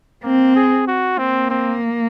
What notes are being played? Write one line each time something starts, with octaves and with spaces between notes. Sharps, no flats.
A#3 C4
G#4
F#4
A#3 C4
C4